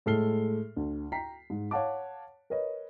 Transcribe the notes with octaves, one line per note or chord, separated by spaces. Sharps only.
A2 G#3 A4 F6 C7 G7
D2
G5 A#5 B6 C7
G#2
C#5 F5 F#5 A5 D6
A#4 B4 C#5 D#5